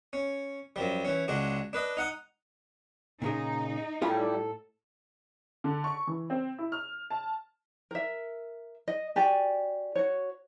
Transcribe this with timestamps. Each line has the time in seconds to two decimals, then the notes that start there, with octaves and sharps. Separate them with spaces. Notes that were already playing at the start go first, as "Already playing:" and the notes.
0.13 C#4
0.76 F#2 F3 G3
1.05 E3 C#4
1.28 C#2 G#3 D4 F#4
1.73 D4 B4 D#5
1.97 D#4 F#5 D#6
3.22 A#2 C#3 D#4 G#4
4.02 A2 G3 E4 F4 G#4 A4
5.64 D3
5.84 C#6
6.07 E3
6.30 C4
6.58 E4
6.72 F6
7.10 A5
7.91 A#4 E5
8.88 D#5
9.16 F#4 G4 D5 G#5
9.95 F#4 C#5